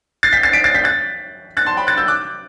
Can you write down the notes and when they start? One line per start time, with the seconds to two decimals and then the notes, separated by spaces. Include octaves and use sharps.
0.23 A6 C7
0.33 G6 B6
0.43 A6 C7
0.53 B6 D7
0.64 A6 C7
0.75 G6 B6
0.84 F#6 A6
1.57 F#6 A6
1.66 A5 C6
1.77 G5 B5
1.87 F#6 A6
1.97 E6 G6
2.08 D6 F#6